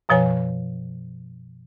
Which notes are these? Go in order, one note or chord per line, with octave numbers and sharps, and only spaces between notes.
F#2 B2 F3 C#5 G#5